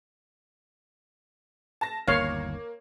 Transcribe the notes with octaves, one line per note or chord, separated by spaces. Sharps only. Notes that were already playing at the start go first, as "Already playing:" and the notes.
A5 A#6
G1 D#2 A#3 C#5 F5